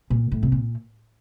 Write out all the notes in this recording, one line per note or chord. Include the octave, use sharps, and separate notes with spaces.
A#2
A2
C3
A#2